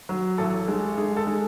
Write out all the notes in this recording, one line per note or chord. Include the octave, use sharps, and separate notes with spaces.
F#3
A1 A4
G#3
G#3 G#4
A4
G#3